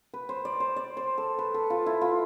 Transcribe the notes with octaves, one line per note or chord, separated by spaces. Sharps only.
B4
C5
D5
C5
D5
C5
A4
B4
A4
F4
E4
F4